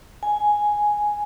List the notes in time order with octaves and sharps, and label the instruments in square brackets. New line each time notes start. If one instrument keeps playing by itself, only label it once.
[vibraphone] G#5